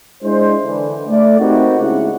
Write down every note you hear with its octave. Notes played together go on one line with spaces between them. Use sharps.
G#3 D4 E4 C5
D3 E3
A3 D5
A#3 C4 D#4 E4 F#4 G4
G#2 C#3 E4 F#5